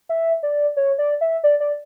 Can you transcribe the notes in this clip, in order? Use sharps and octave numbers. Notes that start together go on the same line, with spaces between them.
E5
D5
C#5
D5
E5
D5
D5